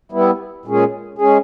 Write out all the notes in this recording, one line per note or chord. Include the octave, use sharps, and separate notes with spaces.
G3 B3 E4
A#2 G#3 C#4 G#4
G#3 C#4 G#4